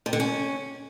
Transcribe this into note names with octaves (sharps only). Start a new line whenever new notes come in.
C3
D3
C#4